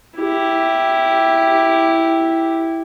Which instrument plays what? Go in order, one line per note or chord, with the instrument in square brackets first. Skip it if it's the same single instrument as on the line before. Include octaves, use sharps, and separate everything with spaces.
[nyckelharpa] E4 G4